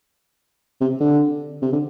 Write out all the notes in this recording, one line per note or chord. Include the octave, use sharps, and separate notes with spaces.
C3
D3
C3
D3